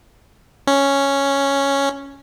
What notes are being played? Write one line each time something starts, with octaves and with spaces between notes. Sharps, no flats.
C#4